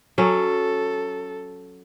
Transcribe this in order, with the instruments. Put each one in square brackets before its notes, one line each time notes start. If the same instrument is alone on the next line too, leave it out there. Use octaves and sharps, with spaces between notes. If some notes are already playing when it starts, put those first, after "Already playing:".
[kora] F#3 C#4 [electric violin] A4